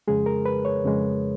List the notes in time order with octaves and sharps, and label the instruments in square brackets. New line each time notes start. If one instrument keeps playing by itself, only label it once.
[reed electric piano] F2 C#3 G#3 G#4
A#4
B4
C#5
F2 C#3 G#3